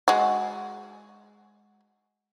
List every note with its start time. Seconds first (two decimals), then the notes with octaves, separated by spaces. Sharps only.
0.08 G#3 F#4